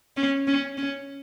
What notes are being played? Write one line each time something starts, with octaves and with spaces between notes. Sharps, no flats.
C#4
C#4
C#4